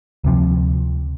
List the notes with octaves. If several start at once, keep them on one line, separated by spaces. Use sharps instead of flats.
D2 C3 F3